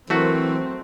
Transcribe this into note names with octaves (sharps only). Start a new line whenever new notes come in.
E3 F#3 A3 C4 F#4 A#4